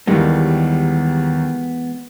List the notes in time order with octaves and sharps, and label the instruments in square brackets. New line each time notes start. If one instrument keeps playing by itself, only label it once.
[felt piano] D#2 D#3 G3 [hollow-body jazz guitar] E3 G#3 B3